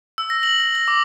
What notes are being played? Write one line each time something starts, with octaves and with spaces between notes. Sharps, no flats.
E6
A#6
F#7
A#6
A#6
D6